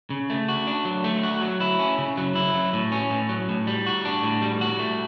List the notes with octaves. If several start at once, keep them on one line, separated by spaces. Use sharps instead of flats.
C#3
A3
F#4
D4
F#3
A3
F#4
F#3
E4
C#4
C#3
F#3
E4
F#3
A2
C#4
A2
F#3
A2
G3
F#4
D4
A2
G3
F#4
A3